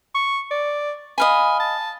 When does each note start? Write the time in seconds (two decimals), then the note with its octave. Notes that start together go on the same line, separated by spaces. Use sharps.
0.14 C#6
0.51 D5
1.18 D#5 F5 G#5 B5
1.60 A5